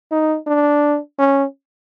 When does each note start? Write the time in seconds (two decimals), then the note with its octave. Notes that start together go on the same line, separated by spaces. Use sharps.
0.11 D#4
0.47 D4
1.19 C#4